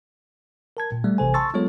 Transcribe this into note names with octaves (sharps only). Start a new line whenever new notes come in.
A#4 A5 G#6
A#2
G3 A3
A1 C3 E3 A4 C5 G#5
A5 C6 C#6 E6 A6
F#3 G#3 B3 F4 A4 C#5